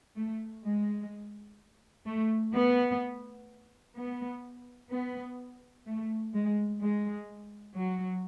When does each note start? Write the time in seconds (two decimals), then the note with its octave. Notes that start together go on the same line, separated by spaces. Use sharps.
0.16 A3
0.64 G#3
2.06 A3
2.54 B3
3.96 B3
4.91 B3
5.86 A3
6.34 G#3
6.81 G#3
7.76 F#3